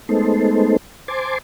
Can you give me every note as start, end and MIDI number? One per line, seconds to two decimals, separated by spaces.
0.09 0.77 56
0.09 0.77 57
0.09 0.77 59
0.09 0.77 63
0.09 0.77 69
0.09 0.77 72
1.08 1.38 72
1.08 1.38 80
1.08 1.38 81
1.08 1.38 84
1.08 1.38 86